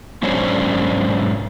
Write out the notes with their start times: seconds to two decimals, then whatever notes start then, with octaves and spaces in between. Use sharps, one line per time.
0.23 G#2 F#3 C#4 D4 C5 C#5